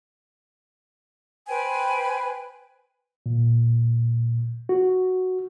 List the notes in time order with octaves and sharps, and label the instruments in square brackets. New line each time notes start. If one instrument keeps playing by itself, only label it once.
[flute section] B4 C5 G5 G#5
[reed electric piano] A#2
F#4